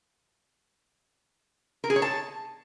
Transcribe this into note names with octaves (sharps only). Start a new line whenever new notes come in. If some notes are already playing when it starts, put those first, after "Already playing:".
A#4
G#4
C#5
A5